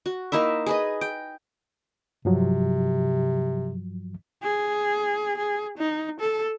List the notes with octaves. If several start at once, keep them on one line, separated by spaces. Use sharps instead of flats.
F#4
A#3 D#4 E4 E5
G#4 B4 D#5
G5
G2 C3 F3 F#3
G#4
G#4
D#4
A4